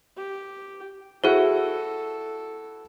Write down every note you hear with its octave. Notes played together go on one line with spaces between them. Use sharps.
G4
E4 F#4 G#4 A4 C5 F#5